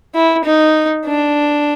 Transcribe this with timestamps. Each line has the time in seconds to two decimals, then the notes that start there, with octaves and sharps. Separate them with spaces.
0.15 E4
0.45 D#4
1.06 D4